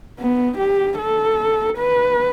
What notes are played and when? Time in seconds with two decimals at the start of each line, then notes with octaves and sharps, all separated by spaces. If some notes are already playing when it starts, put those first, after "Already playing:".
0.19 B3
0.58 G4
0.99 A4
1.78 B4